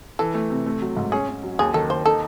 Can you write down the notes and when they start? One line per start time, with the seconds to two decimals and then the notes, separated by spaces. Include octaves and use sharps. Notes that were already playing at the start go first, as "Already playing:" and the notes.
0.19 E3 A4
0.34 A3
0.50 C3
0.66 A3
0.82 F#3
0.97 G#2
1.12 C#4 G#4
1.28 C#4
1.43 F#3
1.59 D#2 G#4
1.74 D#3 A4
1.90 D#2 C5
2.06 D#4 A4